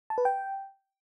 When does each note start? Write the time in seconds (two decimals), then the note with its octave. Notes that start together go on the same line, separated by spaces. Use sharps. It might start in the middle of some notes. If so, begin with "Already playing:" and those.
0.10 A5
0.18 B4
0.25 G5